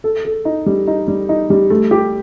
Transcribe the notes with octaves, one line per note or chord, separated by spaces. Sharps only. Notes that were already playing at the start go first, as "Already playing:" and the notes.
A4
A4
D#4
G3
D#4
G3
D#4
G3
A3
G4